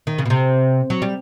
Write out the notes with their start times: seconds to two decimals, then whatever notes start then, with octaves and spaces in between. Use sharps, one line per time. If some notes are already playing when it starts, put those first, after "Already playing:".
0.07 D#3
0.18 C#3
0.26 B2
0.30 C3
0.90 F#3
1.02 G3